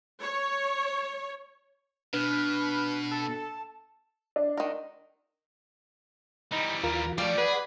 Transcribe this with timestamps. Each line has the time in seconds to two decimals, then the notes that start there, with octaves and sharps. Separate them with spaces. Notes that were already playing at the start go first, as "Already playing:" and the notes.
0.21 C#5
2.14 B2 D4 B4 F6
3.11 A4 A5
4.36 D4
4.57 D#3 A#4
6.52 E3 G3 D#4
6.83 D#2 F4 A#4
7.18 F3 G3 A3 D5 F5
7.38 G#4 B4 F#5